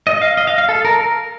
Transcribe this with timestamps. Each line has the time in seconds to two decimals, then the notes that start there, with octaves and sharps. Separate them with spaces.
0.07 D#5
0.22 F5
0.37 D#5
0.47 F5
0.58 F5
0.69 A4
0.85 A#4